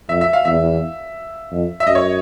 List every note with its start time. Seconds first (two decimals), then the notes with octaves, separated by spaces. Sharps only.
0.09 F2 E5
0.21 E5
0.33 F5
0.45 E2 E5
1.52 F2
1.80 E5
1.87 F#2 D#5
1.95 C#5